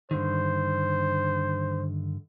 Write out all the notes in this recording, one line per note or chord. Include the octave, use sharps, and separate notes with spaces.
G2 D3 D#3 C5